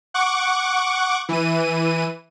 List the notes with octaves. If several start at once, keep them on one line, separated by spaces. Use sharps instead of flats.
F#5 C#6 D6
E3 D#7